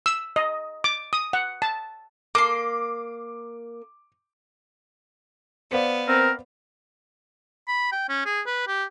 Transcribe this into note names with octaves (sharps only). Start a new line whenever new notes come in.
E6
D#5
D6
D#6
F#5
A5
A#3 C6 D6
B3 C5 D5 F5
C4 A#4
B5
G5
C#4
G#4
B4
G4